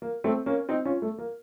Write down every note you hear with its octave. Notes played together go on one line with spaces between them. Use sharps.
A#3
A3 C4
A#3 C#4
C4 D#4
C#4 F4
A3
A#3